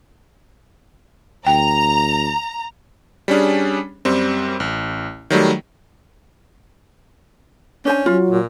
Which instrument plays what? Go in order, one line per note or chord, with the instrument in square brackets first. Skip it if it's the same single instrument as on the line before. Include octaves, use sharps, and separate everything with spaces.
[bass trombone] D2 [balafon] G5 [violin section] A#5
[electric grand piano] G3 C#4 D4 G#4
F#2 G3 C4
A1
D#3 F#3 G3 A3
[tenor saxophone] C#4 [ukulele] D4 C5 G#5
[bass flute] F#3 [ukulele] F4
[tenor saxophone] A#2